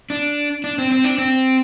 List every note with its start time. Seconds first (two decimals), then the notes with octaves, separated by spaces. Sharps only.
0.10 D4
0.64 D4
0.78 C4
0.91 C4
1.04 D4
1.18 C4